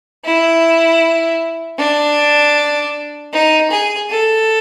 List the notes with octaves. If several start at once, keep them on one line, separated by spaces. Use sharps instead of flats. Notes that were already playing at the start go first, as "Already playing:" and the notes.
E4
D4
D#4
G#4
A4